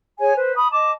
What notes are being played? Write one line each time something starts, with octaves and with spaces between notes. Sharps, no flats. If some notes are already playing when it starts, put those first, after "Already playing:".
G#4 C#5 G#5
B4 C5
B5 D#6
D#5 A5 D6